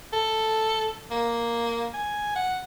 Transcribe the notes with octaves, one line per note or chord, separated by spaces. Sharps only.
A4
A#3
G#5
F#5